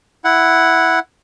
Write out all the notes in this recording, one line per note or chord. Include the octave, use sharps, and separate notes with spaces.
E4 F#5